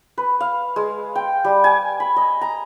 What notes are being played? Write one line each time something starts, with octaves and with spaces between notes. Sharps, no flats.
B4
F5
G#3
G5
G3
G#5
B5
D#5
A#5